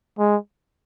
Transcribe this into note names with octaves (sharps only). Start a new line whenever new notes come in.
G#3